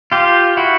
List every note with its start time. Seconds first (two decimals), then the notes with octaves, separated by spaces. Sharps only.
0.12 F4 G4
0.57 E4 F#4